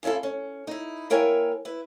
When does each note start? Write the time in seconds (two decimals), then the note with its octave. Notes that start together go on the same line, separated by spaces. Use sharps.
0.03 C#3 C#4 E4 F4 A4
0.23 C#4
0.67 D#4 E4
1.10 A#3 E4 A#4 C#5 G5 G#5
1.65 E4 B4